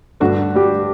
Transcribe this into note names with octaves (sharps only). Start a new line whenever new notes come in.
G2 D3 A3 D4 F#4
G3 G4